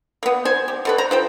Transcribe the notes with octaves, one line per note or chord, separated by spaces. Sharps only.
A#3 B3
C5 G#5
G4
B2 A4 B4
C5 A#5
F3 C5 G5